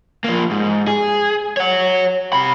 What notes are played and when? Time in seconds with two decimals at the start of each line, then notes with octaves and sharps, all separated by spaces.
0.24 F3 A#3
0.51 G#2
0.88 G#4
1.57 C#5 F#5
2.33 C3 B5